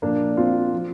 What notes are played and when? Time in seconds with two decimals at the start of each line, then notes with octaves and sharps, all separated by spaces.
0.02 A#2 F3 A#3 D4
0.37 C4 F4
0.73 F3